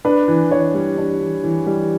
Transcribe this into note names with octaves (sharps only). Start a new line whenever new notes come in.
D4 B4
E3
E3 C#5
G3
D4
E3
E3
G3